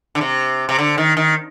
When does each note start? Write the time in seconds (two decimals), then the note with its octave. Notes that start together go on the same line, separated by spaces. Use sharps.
0.15 D3
0.21 C3
0.69 C3
0.78 D3
0.98 D#3
1.17 D#3